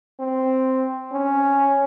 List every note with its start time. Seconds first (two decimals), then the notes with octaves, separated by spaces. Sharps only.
0.20 C4
1.12 C#4